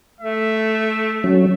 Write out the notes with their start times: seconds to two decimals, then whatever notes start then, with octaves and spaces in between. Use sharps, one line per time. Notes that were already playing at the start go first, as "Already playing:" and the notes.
0.21 A3 E5
1.24 F#3 C#4